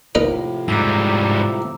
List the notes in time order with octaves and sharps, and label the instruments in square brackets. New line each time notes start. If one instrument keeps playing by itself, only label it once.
[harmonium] A2 C3 F3 [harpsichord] D#4 A#4 B4
[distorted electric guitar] G#2 G3 [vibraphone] A#5 D6 E6